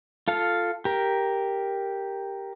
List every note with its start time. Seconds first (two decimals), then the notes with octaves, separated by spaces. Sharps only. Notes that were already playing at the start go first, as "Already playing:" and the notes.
0.28 F4 A4 F5
0.85 G4 A#4